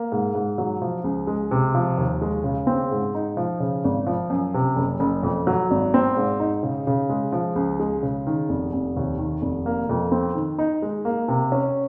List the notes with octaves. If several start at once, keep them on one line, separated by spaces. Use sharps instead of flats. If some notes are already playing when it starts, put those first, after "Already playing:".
Already playing: A#3
G#2
G#2
F#3
F3
C#2
G#3
C3
F3
D#2
G#3
C#3
C4
G#2
D#4
F3
C#3
G#1
F3
F#2
C3
F#1
F#1
F2
F#3
G#1
C4
G#2
D#4
C#3
C#3
G#3
F3
C#2
G#3
C#3
D#3
F1
F1
D#2
D#3
F1
A#3
F2
C4
D#3
D#4
G#3
A#3
C3
C#4